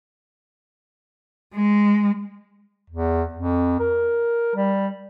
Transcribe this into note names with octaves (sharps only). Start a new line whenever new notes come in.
G#3
E2
F2
A#4
G3